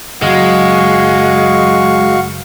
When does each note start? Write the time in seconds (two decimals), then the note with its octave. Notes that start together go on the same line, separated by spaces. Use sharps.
0.22 F#1 F#3 G#3 F#4 F5 C#6